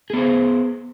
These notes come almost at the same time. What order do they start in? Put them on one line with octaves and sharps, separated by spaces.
G#4 B3 C5